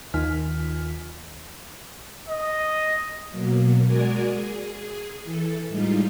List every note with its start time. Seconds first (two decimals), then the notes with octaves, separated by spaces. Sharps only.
0.14 D#2 D#3 F4 G#5 F6 B6
2.28 D#5
3.30 B2 F#3 A#3
3.85 G#3 F#4 A#4 D5 G#5
4.29 G#4
5.24 E3 A4
5.69 A2 G3 G#3 D#4 F4